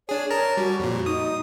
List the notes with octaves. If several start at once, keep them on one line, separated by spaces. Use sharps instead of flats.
D4 G#4 C#5
A#4 A5 A#5
G3 F#4
F2 A#2
D#4 D#6